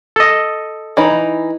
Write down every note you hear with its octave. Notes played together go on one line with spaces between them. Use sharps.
A4 D#5
E3 D#4 B5